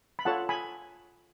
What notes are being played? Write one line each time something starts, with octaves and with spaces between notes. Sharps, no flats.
B5
F4 A4 C#5 F#5 A5
G#5 B5